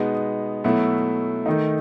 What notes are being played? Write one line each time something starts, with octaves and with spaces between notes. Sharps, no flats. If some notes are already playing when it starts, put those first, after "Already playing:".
Already playing: B2 G#3 B3 D#4
B2 F#3 A3 E4
D#3 A3 D#4